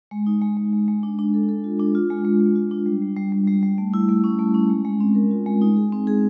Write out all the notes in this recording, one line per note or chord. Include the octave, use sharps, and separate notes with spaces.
G#3
D#4
G#3
G#3
G#3
G#3
D4
D4
A4
A4
F4
D4
F4
G#3
G#3
G#3
F4
D4
G3
G3
G3
G3
G3
G3
A3
E4
A3
C#4
A3
C#4
G#3
G#3
C4
A#4
F4
G#3
D#4
G#4
C4
G#4